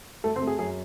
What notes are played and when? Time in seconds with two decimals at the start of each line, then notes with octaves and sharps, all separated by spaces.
0.24 A3 A4
0.36 C4 C5
0.42 A3
0.47 G#4
0.59 F#2 G#4